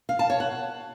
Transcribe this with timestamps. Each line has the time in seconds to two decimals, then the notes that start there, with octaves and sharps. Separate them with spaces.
0.09 F5
0.19 A5
0.30 C#5
0.40 F#5